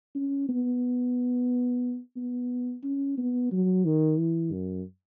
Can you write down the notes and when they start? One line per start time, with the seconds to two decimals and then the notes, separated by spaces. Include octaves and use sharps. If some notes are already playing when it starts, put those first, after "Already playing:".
0.15 C#4
0.49 B3
2.17 B3
2.84 C#4
3.18 B3
3.52 F#3
3.85 D#3
4.19 E3
4.52 F#2